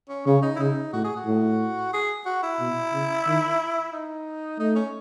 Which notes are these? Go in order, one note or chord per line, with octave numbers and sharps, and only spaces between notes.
C#4
C#3 C#4
D#4
E4
C#3 D#4
A2 F#4
G#4
F#4
A2
G#4
F#4
E4
B2
C#3
D#3
D#4
A3 D#4
C#4